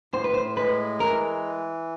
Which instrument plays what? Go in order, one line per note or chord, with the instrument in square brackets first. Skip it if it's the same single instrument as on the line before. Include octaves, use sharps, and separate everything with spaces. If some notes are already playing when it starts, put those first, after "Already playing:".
[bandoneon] A2 [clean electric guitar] C5
[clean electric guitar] B4
C5
[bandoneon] G#3 [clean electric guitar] B4
[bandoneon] E3 [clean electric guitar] A#4